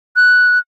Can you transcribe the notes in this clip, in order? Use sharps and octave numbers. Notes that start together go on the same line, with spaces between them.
F#6